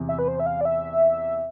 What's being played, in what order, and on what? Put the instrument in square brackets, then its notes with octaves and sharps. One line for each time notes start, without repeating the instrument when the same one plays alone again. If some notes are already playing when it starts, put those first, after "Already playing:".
Already playing: [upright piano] E2 C3
[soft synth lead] E5
B4
C5
E5
F5
D5
E5